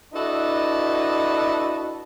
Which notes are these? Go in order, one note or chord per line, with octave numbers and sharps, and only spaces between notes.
D4 E4 F#4 A4 B4 D#5